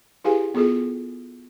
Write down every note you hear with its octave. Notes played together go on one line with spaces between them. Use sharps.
E4 G4 G#4 B4 F5 G#5
B3 F4 G#4 A4